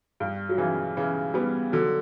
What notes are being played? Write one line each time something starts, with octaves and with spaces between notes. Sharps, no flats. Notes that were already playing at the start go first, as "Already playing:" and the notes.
G2
F#3
C#3 E3
C#3 E3
G3 B3
D3 F#3